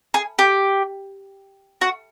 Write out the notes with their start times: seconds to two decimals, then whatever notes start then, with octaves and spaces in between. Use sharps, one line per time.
0.14 G#4
0.39 G4
1.81 F#4